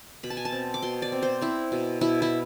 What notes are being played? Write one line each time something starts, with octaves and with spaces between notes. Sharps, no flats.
B2 B5
A5
G#5
A5
C4
D6
B2 C6
D5
C4
C5
C4 E4
B2
B2 E4
E4